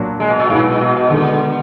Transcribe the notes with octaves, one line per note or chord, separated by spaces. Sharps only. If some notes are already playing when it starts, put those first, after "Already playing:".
Already playing: A#2 F#3 D4 F#4
G#3
B2
A#2
G#2 B2 G#3 B3 D#4 F#4
A#2
B2
B2
D3 D#3 G#3 B3 D#4